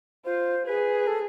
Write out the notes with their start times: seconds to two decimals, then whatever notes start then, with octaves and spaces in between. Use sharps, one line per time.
0.25 F4 C5
0.66 G#4 B4
1.07 A4